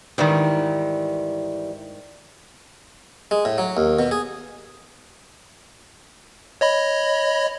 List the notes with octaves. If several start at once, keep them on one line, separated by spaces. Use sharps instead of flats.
G#2 D#3 E3 G3
G#3
A2
F#3
D#2
B2
G#4
C#5 D#5 B5